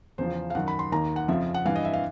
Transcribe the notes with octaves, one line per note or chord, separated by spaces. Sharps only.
E2 C#3 F3 C5
F5
F#2 D#3 F#5
B5
C6
D#2 D#3 A#5
F#5
F2 C#3 F3 E5
F#5
G2 E3 F5
D#5
E5
F5